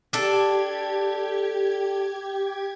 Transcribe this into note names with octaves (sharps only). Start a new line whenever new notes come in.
D4 G4 A4 G#6